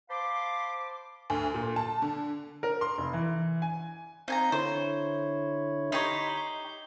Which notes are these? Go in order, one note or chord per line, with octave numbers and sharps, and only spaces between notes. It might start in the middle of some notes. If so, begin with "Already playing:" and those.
C5 F5 A5 B5 C6 D6
D2
A#2
A5
D3
A#4
C6
F1
E3
G#5
C4 D#4 F5 G#5 A#5 G6
D3 E4 C5 C#5
D#4 G4 C#5 D#5 B5 C6
G6